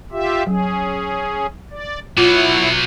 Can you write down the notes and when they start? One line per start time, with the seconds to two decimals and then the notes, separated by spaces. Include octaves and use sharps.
0.12 F4 G4 E5
0.47 F#3 C#4 G#4
1.71 D5
2.18 B2 F#3 E4 F4 C#5 F#5